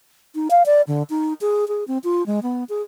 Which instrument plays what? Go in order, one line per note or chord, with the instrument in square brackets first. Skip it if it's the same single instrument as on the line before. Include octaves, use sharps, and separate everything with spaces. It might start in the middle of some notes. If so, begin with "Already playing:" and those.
[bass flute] D#4
F5
D5
D3
D#4
G#4
G#4
C4
F4
G#3
B3
G#4